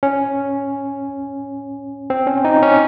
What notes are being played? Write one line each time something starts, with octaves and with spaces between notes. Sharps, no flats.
C#4
C4
C#4
D#4
C#4